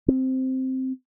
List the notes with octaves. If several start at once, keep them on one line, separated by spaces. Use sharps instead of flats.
C4